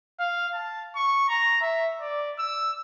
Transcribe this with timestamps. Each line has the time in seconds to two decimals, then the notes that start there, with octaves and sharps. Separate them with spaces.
0.20 F5
0.54 A5
0.96 C#6
1.29 A#5
1.61 E5
2.01 D5
2.39 E6